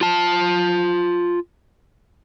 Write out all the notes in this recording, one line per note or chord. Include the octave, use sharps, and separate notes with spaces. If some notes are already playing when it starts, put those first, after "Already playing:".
F4 A5